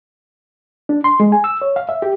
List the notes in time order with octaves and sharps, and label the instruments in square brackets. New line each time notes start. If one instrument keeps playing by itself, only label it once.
[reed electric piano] D4
C6
G#3
G#5
E6
C#5
F5
E5
G4